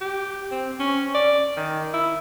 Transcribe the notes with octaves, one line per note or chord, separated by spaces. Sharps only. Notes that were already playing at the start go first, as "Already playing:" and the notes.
G4
C4
C#4
D5
D#3
E4